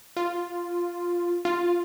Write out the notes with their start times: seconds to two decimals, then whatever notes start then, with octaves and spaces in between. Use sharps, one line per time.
0.17 F4
1.45 F4